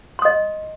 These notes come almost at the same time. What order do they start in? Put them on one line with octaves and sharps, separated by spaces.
C6 D#6 D#5